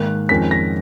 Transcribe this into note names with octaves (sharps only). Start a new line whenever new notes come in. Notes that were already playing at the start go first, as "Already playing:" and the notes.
Already playing: G#2 D#3 A#3 F#6
F2 D#3 G#3 C#4 B6
A#6